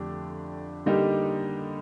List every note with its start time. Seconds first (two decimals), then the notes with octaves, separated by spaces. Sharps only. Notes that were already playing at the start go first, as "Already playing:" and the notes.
Already playing: F2 D3 A3 D4 G4
0.86 D3 G3 A#3 D#4 G4